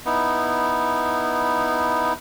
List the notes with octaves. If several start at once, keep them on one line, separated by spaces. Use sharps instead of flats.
B3 D#4 E4